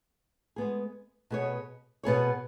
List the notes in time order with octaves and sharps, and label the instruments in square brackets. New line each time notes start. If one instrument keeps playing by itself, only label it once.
[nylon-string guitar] G#3 B3 G#4
B2 B3 G#4 C#5
B2 B3 G#4 C#5